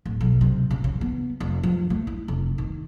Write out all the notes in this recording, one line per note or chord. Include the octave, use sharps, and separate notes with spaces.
D1
B1
C3
C#3
C#3
B3
F1
F3
A3
E4
F1
D#3